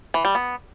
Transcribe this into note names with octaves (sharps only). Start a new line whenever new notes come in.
E3
G3
B3